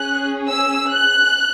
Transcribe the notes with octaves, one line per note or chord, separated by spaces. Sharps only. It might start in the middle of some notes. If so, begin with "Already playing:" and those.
Already playing: C#4 G#4 F#6
E6
F#6